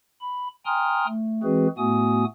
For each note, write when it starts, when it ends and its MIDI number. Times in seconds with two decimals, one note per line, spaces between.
0.21 0.48 83
0.66 1.06 79
0.66 1.06 80
0.66 1.06 82
0.66 1.06 84
0.66 1.06 87
0.66 1.06 89
1.07 1.42 57
1.43 1.68 52
1.43 1.68 56
1.43 1.68 60
1.43 1.68 66
1.43 1.68 68
1.43 1.68 71
1.78 2.25 45
1.78 2.25 57
1.78 2.25 59
1.78 2.25 66
1.78 2.25 80
1.78 2.25 87